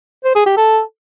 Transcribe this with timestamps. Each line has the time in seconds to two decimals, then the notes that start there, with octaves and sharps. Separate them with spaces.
0.25 C5
0.35 G#4
0.46 G4
0.57 A4